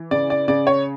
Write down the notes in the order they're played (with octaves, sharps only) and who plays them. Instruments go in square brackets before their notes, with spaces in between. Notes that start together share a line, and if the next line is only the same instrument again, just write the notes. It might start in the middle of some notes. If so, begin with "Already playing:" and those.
Already playing: [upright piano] E3
C#3 D5
D5
C#3 D5
C#5